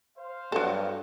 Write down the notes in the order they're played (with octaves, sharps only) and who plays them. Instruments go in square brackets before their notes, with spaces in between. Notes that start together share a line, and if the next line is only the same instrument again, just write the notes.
[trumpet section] C5 F5
[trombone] G2 [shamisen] F#3 A4